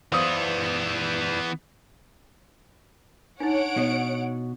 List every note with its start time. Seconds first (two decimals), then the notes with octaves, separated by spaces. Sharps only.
0.12 E3 B3 B4 C5 D5 F5 D#6
3.40 D4 D#4 C#5 F#5 D7
3.77 B2